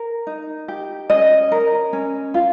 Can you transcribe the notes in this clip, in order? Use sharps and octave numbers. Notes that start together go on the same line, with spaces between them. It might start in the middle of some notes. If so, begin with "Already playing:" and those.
Already playing: A#4
D#4
G4
C#4 D#5
A#4
C#4
F4